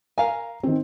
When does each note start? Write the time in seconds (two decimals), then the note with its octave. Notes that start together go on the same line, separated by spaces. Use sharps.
0.18 A#4 F5 G#5 A#5
0.63 D#3 C4